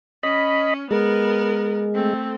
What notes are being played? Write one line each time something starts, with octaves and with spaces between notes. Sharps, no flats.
C#4 D#5 B5
G#3 B3 A#4
A3 C4